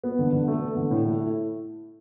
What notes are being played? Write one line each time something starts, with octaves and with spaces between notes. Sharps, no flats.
B3
D3
D3
A3
B3
D3
A2
A3
E4